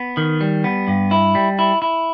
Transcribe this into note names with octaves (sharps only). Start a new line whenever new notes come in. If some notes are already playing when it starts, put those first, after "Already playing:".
Already playing: B3
D#3
G3
B3
G2
E4
G3
E4
E4